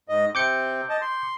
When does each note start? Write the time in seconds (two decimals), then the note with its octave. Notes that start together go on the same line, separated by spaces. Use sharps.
0.09 G#2 D#5
0.35 C3 C4 D6 G6 C#7
0.90 D#5 A5
1.01 C6